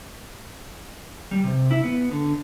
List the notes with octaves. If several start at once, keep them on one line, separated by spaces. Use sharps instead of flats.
G3
C3
E4
B3
D3